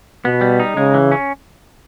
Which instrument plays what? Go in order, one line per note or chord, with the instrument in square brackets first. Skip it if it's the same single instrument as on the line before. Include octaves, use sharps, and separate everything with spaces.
[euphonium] B2 [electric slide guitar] B3
[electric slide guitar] G3
D#4
[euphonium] C#3 [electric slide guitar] G#3
[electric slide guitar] E3
C#4